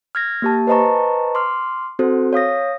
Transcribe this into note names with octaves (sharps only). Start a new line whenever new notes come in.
F6 G#6 A#6
A#3 G4 A5
B4 C5 D#5 A5 A#5 C#6
C6 D6 F6
C4 F#4 A4 C5
C#5 F5 D#6 A#6